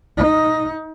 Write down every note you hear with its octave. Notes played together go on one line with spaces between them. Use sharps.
D#4